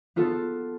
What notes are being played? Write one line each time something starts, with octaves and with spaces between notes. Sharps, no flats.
B3 F4 A4